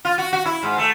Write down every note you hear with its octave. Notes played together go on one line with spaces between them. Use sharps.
F4
F#4
F#4
E4
G#2
A3